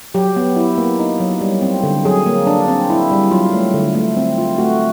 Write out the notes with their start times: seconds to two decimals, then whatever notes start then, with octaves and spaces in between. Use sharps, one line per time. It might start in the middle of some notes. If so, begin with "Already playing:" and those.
0.14 F#3 G4
0.36 B3
0.56 E4
0.78 A#3
0.99 D#4
1.20 F#3
1.41 G3
1.62 C4
1.83 D3
2.05 F#3 G#4
2.26 A#3
2.47 D4
2.68 C4
2.90 E4
3.11 G3
3.31 F#3 F4
3.53 A3
3.74 D3
3.95 A3
4.17 C4
4.38 F4
4.58 A3 F#4